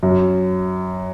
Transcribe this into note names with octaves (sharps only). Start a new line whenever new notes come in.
F#2